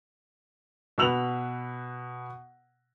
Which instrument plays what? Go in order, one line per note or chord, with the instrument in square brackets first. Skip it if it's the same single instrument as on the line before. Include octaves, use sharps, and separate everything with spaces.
[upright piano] B2 B4 E6 F7 F#7